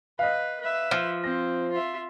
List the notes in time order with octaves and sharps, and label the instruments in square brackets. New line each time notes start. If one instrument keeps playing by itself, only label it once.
[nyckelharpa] B4 [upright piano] D#5 F5
[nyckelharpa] B4 E5
[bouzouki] F3
[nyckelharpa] C4 [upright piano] A#6
[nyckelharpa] F4 E5